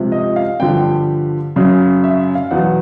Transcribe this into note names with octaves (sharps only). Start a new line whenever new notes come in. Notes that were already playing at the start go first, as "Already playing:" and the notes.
Already playing: C#2 C3 F3
D#5
F5
G2 D3 F3 G5
G5
F#2 C#3 F#3
E5
F5
E2 B2 F#3 F#5